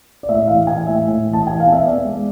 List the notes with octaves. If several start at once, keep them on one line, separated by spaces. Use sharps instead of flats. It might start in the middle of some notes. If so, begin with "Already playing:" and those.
D5
A2 E5
E3 F5
E3 G#5
A2 E5
A2
E3
A5
E3 G#5
F5
B3
E5
B3 D5
G#3